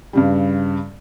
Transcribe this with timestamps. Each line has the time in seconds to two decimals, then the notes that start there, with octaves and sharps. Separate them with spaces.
0.13 G2 C#3 G3